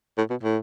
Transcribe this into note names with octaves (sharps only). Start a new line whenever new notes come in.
A2
B2
A2